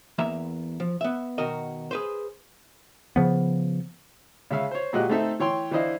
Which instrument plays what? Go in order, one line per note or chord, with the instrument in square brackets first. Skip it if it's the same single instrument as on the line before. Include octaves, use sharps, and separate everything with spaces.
[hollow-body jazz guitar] E2 A#3 E5 A#5
F3
B3 E5
B2 D#3 F#4 A#4 D#5
G#4 B4 C5
[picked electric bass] C#3 F3 B3
[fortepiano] C#3 G#3 E5 F5
C5 C#5
A#2 G#3 F#4 G4 D#5 F#6
A3 C4 D#4 A4 E5
E3 C#5 G5 C6
E3 D4 E4 C5 D#5 F5